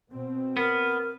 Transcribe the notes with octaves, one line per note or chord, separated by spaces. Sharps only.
B2 C4
B3 A#4